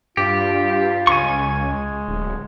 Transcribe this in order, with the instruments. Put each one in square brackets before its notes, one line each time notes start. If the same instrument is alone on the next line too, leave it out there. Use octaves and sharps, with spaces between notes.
[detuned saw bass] G2 [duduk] F4 [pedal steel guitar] G4
[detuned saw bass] C#2 [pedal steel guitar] G#5 C#6
[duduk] G#3
[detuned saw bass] D1